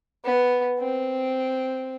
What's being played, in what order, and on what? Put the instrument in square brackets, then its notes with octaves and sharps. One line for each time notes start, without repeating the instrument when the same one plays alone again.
[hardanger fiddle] B3
C4